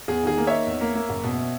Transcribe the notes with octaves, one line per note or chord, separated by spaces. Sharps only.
E2 G#4
D#3 G#4
A#3
D#4 C#5 E5
E2
A#3
A#3
F#1
B2